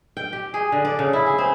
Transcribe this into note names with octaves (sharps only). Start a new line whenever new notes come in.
G5
G4
G#4
D3
D5
C#3
E4
G#4
C4